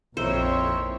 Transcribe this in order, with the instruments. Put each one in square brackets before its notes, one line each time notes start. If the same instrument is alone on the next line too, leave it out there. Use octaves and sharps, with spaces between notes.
[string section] A#1 C#5 [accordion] F2 [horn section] D#4 E4 A#4 [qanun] C5